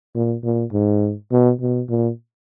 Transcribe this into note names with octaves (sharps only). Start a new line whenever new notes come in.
A#2
A#2
G#2
B2
B2
A#2